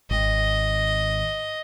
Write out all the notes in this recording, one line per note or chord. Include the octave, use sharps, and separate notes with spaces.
G#1 D#5